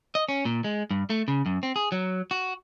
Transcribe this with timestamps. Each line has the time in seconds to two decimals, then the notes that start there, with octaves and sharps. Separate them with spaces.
0.15 D#5
0.29 C#4
0.45 A#2
0.64 G#3
0.91 G2
1.10 A3
1.28 C#3
1.46 F#2
1.63 C4
1.76 G#4
1.92 F#3
2.31 F#4